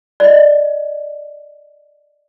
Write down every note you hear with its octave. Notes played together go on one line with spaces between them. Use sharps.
D5 D#5